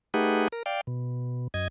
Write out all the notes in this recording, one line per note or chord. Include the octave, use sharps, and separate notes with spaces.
A3 D#4 G4 G#4 B4 F#5
A#4
D5 F5 G5
B2
F#2 D#5 G#6